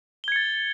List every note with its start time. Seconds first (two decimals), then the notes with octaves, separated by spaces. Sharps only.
0.24 G7
0.28 G#6
0.32 C#7
0.36 A6